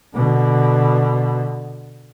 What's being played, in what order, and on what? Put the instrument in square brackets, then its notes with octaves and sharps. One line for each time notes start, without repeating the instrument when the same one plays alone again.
[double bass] B2 D3